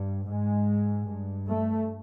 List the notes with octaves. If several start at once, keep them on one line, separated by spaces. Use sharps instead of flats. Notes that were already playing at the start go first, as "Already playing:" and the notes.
Already playing: G2
G#2 G#3
G2
A3